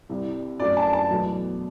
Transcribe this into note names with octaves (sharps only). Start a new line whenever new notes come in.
C2 C3 G3
F#2 F#3 A3 D5
A5
A5
E2 B2 F#3 A3